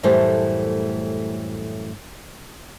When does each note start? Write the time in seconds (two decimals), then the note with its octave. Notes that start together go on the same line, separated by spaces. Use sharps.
0.03 F#2 A2 E3 G3 A3 C5